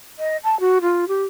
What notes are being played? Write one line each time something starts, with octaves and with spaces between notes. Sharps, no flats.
D#5
A5
F#4
F4
G4